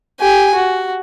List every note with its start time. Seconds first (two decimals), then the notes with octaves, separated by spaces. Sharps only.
0.20 G4 G#5
0.55 F#4